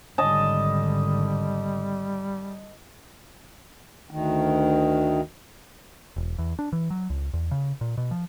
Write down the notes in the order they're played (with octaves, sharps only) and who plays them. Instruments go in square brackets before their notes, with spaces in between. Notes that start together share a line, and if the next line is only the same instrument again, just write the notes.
[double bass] G#1 D3 [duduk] G3 [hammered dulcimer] D#5 A5
[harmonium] D2 D#3
[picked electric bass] E1
E2
D4
E3
F#3
C#2
E2
C#3
A#2
B2
F3